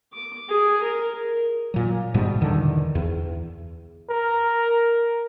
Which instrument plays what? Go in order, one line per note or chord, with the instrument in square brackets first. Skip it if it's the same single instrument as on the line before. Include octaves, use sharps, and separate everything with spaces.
[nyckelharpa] D6
G#4
A#4
[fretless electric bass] A#2 F#3
G#2 B2 G3
E2 D3 D#3
E2
[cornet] A#4